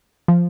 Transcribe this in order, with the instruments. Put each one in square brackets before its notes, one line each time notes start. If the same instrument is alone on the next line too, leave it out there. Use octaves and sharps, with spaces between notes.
[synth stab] F3